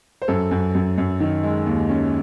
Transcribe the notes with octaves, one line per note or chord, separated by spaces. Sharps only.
C5
F#2 A4
F#2
F#2
F#2
D#3
G#3
D#2
C#4